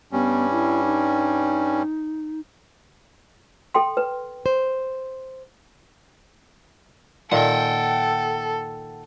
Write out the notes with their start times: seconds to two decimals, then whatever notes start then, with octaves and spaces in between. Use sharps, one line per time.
0.12 G2 G3 B3 C#4
0.51 E4
0.84 D#4
3.74 A4 G5 C6
3.97 B4
4.46 C5
7.32 A#2 D#3 A4 F#5 G5